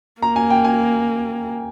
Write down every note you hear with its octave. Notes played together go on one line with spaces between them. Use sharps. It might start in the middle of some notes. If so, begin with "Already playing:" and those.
A#3 A#5
G#5
G5
G#5